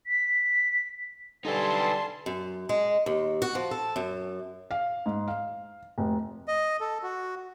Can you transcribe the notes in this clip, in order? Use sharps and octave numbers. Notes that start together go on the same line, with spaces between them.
B6
D3 G3 D#4 A4 B4 G#5 A5 C6
F#2
G#3
D#2
F#4
F3
A4
F#2
F5
G#2
F5
F1
D#5
A4
F#4